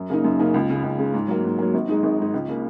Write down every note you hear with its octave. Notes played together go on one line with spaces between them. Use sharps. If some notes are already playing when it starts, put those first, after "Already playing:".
Already playing: F#2
C#3 A#3 D#4
F#2
C#3 A#3 D#4
C#2
C#3 G#3
C#2
C#3 G#3
G#2
F#3 A#3
G#2
F#3 A#3
G#1
G#2 G#3 D#4
G#1
G#2 G#3 D#4
C#2
C#3 A#3